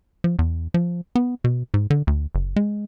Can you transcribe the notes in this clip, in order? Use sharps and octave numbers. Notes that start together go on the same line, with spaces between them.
F3
E2
F3
B3
B2
G#2
D3
D2
F#1
G#3